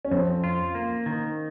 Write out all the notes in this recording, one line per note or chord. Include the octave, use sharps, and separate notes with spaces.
C#4
F2 C4
F4
A#3
D#3